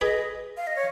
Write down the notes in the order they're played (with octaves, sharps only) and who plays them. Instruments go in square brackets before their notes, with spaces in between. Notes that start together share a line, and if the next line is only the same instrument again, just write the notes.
[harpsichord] G#4 B4 [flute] D#5
[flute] F5
D#5
C#5